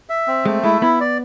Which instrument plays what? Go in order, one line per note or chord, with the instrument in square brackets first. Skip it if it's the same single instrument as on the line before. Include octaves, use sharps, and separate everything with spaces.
[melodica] E5
C4
[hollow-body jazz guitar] G#3 [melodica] A3
[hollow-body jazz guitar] G#3 [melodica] E4
[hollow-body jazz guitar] B3 [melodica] E4
[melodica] D5